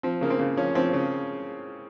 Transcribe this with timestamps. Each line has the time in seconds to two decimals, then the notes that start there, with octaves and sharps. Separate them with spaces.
0.03 F3 C4
0.21 C#3 A#3
0.30 C4
0.40 C#3
0.57 F3 C#4
0.75 F3 C4
0.93 C#3 C#4